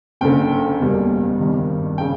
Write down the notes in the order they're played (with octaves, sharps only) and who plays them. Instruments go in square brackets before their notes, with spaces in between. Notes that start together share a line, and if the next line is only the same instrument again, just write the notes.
[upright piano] F#1 F#2 D3 G5
F#1 E2 B2 G3 A#3
G#1 G2 D#3
C#3 G5